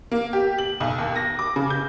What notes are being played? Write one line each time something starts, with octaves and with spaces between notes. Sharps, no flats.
A#3
G4
F#7
B1
D#2
A#6
D6
C#3
G6